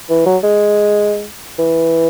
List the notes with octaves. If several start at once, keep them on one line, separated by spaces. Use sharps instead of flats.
E3
F#3
G#3
E3